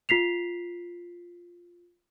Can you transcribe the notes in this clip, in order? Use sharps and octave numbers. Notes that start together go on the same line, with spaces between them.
F4 B6 C7 F7